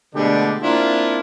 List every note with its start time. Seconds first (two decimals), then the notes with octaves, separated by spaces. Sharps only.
0.14 B2 D3 G#3 A3 D4 G4
0.62 A#3 C4 D4 E4 F4